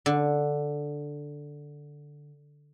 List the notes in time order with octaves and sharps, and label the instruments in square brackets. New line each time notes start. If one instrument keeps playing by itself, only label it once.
[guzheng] D3